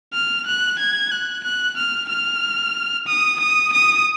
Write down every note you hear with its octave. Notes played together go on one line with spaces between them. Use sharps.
F6
F#6
G#6
F#6
F#6
F6
F6
D#6
D#6
D#6